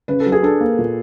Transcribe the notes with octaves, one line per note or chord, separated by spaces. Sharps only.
C#3 B4
A4
F#3
G#4
D4 A4
A#3
A#2